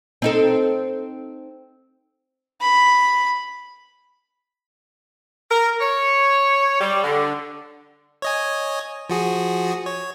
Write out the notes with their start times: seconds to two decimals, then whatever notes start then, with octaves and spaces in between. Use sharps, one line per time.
0.22 C4 D#4 A4
2.61 B5
5.50 A#4
5.80 C#5
6.81 G3
7.04 D3
8.22 C#5 D#5 G#5
9.10 F3 F#4 G#4
9.86 C#5